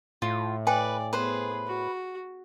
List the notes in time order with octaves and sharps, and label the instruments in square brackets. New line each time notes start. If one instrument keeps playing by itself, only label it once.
[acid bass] A2 [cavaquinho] F4
[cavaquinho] B4 [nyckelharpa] D5 [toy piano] G5 G#5
[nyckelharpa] B3 G#4 [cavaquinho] B4 C5
[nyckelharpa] F#4